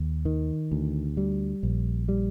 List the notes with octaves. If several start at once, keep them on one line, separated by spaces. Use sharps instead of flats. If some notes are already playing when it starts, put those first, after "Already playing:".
Already playing: D#2
D#3
D2
G3
A#1
G3